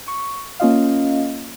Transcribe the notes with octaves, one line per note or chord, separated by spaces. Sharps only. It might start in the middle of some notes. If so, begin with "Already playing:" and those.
C#6
A#3 C#4 F4 D#5 F5